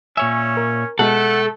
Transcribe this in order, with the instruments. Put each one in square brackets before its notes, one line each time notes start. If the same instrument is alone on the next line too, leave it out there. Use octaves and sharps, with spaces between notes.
[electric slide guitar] A#2 C#5 E5 [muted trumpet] C#4 [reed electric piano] G#5
[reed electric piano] A#4
[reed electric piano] B2 G#3 [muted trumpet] A3 [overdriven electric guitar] A4 [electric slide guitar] F#5